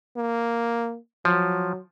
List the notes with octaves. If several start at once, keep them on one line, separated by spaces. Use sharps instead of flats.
A#3
F3 F#3